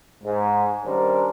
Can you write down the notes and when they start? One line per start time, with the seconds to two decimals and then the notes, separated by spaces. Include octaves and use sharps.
0.23 G#2
0.85 D#3 G3 C#4 D4 A#4 C5